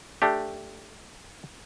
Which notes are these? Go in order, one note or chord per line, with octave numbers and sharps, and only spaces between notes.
A3 D4 G4